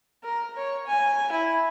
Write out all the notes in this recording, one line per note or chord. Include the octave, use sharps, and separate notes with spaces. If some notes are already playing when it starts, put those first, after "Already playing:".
A#4
C#5
G#5
E4